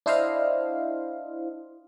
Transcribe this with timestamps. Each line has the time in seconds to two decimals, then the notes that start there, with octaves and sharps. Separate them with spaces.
0.06 D4 E4 C5 D#5 F5